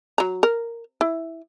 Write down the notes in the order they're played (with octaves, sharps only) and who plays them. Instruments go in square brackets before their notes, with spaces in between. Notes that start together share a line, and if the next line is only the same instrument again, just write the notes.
[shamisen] F#3 A#5
A#4
E4